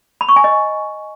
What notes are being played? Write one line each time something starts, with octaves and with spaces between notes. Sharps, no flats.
B5
C#6
G#5
D#5